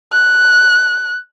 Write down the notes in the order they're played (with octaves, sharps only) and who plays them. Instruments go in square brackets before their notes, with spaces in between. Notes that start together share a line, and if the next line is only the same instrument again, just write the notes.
[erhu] F#6